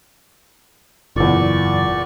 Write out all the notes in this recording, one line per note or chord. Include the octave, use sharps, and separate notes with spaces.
F#1 E2 A#2 D5 C#6